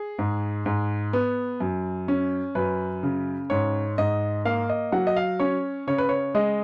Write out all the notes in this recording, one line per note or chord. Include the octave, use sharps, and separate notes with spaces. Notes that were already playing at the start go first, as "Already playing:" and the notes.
Already playing: G#4
G#2
G#2
B3
F#2
C#4
F#2 B4
C#3
G#2 C#5
G#2 D#5
A#3 F5
D#5
F#3 F#5
D#5
F5
C#4 C#5
C#3 C#5
B4
C#5
G#3 D#5